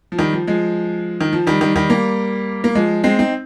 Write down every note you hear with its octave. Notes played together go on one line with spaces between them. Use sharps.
F3
D#3 G3
F3
F3 G#3
D#3
F3
D#3 G3
D#3 G3
D#3 G3
G3 A#3
A#3
F3 G#3
G#3 C4
C4 D#4